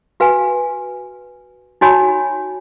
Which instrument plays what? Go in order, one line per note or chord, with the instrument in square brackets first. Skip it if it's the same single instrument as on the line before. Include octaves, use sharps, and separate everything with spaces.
[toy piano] F#4 B4 F5 G#5
D#4 F#4 C#5 G#5 B5